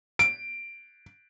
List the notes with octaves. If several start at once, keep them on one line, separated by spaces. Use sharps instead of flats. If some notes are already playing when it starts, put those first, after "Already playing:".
D7